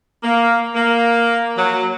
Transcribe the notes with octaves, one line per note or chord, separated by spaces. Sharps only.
A#3
A#3
F#3